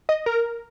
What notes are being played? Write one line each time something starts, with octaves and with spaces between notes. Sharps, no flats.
D#5
A#4